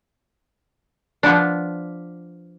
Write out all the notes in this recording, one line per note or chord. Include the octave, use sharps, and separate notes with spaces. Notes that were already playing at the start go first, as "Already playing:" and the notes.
F3 B3 D4